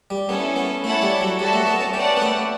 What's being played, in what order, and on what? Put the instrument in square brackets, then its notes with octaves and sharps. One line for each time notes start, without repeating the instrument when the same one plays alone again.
[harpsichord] G3
[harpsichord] B3 [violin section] C#4 E4 A4
[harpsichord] B3
[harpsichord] A3 [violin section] E4 A4 C#5 F#5 A5
[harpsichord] G3
F#3
[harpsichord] G3 [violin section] F#4 A4 E5 A5
[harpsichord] A3
B3
C#4
[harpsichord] C#4 [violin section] G4 B4 D5 F#5 A5
[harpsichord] B3
A3